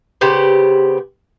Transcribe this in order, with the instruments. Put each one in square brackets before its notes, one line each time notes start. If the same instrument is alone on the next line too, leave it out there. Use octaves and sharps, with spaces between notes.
[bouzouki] C#3 B3 G4 C5